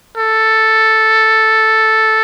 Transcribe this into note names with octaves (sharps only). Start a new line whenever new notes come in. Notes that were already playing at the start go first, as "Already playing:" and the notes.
A4